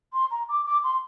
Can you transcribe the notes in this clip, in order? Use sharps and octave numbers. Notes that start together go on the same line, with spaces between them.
C6
A#5
D6
D6
C6